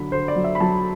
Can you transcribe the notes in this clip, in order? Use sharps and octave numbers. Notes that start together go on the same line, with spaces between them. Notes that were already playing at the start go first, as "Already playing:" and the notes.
Already playing: D3 F#3 B5
D3 C5
D5
F#3
E5
B5
F#3 A5